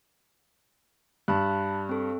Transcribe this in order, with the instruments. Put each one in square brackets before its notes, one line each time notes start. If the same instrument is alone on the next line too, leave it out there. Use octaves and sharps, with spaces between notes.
[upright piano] G2 [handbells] A5 B5 F#6
[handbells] C4 A4